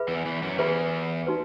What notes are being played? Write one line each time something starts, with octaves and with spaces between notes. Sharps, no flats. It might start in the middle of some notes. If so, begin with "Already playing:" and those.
Already playing: G#4 B4 E5 B5
E2 E3
E2 E3
F#2 F#3
E2 E3 G#4 B4 E5 B5
D#4 F#4 B4